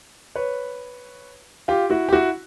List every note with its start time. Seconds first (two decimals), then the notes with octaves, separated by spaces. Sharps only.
0.35 B4 C#5
1.68 F4 G4
1.90 E4 F#4
2.09 G4
2.13 E4 F#4